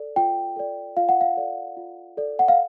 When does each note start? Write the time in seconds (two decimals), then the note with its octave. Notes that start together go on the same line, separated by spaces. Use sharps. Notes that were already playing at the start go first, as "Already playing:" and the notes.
Already playing: A4 D5
0.16 F4 G5
0.56 A4 D5
0.97 F4 F5
1.09 F#5
1.21 F5
1.37 A4 D5
1.77 F4
2.17 A4 D5
2.39 F#5
2.48 F5